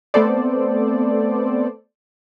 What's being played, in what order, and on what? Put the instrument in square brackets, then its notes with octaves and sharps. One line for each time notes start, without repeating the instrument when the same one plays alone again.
[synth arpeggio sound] A3 B3 C4 A4 C5 D5